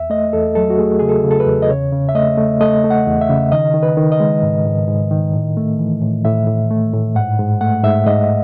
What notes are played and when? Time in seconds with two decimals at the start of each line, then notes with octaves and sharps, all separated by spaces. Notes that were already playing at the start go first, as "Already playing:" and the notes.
Already playing: E2 E5
0.10 A3 D#5
0.33 E2 A4
0.55 F#3 A4
0.70 F#4
0.78 A3 G#4
0.99 C#3 G#4
1.09 A4
1.24 C#3
1.31 A4
1.40 B4
1.46 E2
1.62 D#5
1.70 C#3 C#5
1.92 C#3
2.09 E5
2.15 A3 D#5
2.37 A3
2.60 A3 D#5
2.84 A3
2.90 F#5
3.07 E2
3.21 E5
3.30 C#3
3.52 D#3 D#5
3.74 D#3
3.83 B4
3.97 D#3
4.12 D#5
4.20 G#3
4.42 G#2
4.66 G#2
4.88 G#2
5.11 D#3
5.33 A2
5.57 A3
5.79 E3
6.02 A2
6.25 A2 E5
6.47 A2
6.70 A3
6.93 A2
7.15 G#2 F#5
7.39 G#2
7.61 A3 F#5
7.84 G#2 E5
8.06 G#2 D#5